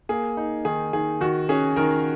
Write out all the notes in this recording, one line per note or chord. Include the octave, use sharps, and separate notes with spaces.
A#3 G#4
D#4
D#3 G#4
D#3 G#4
D#3 F#4
C#4 G#4
D#3 A#4